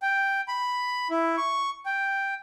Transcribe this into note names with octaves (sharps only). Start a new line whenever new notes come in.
G5
B5
E4
C#6
G5